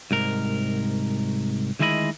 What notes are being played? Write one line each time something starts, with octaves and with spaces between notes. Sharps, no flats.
C2 G#2 A#4
D2 D#3 G#3 E4 D#5 B5